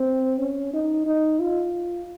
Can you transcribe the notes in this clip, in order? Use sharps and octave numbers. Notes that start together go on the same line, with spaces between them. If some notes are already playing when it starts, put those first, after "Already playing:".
Already playing: C4
C#4
D#4
D#4
F4